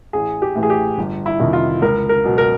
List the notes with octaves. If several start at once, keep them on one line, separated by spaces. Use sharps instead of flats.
A1 G#4
G4
A2 E3
G#4
G4
G1
E4
F2 C3 D#3
F4
C#2 A#4
A#4
B2 F#3
A#4